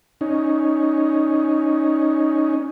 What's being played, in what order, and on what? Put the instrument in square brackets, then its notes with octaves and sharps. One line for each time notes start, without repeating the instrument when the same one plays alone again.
[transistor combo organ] C#4 D#4